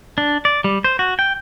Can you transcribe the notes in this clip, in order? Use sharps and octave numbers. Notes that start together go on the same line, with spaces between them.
D4
D5
G3
C5
F#4
G5